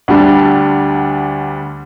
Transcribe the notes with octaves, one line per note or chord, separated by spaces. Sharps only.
D2 D3 G3 D4